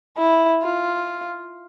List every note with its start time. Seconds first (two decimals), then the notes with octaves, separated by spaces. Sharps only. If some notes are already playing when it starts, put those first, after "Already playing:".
0.18 E4
0.63 F4